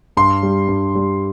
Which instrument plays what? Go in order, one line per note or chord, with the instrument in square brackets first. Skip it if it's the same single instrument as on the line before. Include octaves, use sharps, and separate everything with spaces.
[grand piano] G2 C6
G3
G2
G3